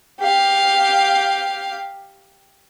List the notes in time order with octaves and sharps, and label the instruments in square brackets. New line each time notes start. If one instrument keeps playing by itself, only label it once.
[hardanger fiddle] G4 F5